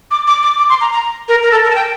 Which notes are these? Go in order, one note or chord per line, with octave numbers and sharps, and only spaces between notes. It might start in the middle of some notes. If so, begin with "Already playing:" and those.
D6
D6
D6
D6
C6
A#5
A#5
A#4
A#4
A4
A#4
A5
G5